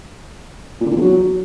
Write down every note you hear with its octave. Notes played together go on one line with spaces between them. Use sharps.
A#2
D3
A#2
E2
F#3